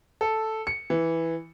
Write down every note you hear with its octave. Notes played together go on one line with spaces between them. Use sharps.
A4
C#7
E3